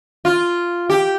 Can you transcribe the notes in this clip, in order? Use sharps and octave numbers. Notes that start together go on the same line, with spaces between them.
F4
G4